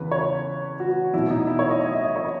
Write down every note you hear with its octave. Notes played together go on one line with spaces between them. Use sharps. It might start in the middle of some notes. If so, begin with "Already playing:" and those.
Already playing: E2 C#3 E3 B4
C#5
F#4
E2 B2 E4
D#4
E4
C#5
D#5
D#5
E5
D#5
C#5